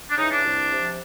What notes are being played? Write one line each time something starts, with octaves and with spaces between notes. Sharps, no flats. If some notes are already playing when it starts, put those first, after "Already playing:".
D4
C#3 E3 D#4
D4
C2
C3 F3